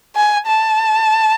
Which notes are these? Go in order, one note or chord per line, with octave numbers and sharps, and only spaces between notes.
G#5
A5